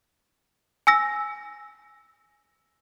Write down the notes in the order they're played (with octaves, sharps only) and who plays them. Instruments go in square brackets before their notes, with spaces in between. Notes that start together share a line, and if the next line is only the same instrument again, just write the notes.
[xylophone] G#5 E6 A#6